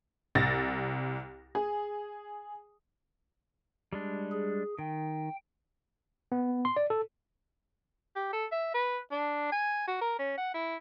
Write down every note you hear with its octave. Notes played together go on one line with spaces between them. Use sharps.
C2 A6 A#6
G#4
G3 G#3 D4
G#4
D#3 G5
B3
C6
D5
A4
G4
A4
E5
B4
D4
G#5
F#4
A#4
C#4
F#5
E4